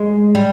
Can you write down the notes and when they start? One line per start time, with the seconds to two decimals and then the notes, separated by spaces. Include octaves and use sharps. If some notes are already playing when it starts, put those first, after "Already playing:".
Already playing: G#3
0.35 G3